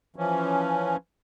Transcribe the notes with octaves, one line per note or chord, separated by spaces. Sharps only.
E3 F3 C#4